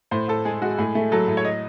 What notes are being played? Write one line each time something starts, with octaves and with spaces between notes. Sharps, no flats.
A2 C5
A2 A4
G#3 G#4
G#3 F#4
A2 G#4
A3
F#3 A4
A2
C#5
D#5